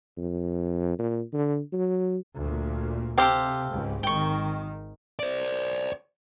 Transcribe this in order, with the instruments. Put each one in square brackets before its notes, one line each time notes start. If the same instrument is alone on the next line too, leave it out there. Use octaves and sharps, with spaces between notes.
[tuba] F2
A#2
D3
F#3
[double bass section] D2 A#2
[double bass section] C3 [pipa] C4 G4 [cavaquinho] A4 C5 F5
[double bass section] C#2 G#2
[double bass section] G#1 D#3 [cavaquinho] G5 C#6
[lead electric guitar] C5 D5